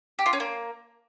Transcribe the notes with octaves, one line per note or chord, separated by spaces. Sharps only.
G4
F4
C#4
A#3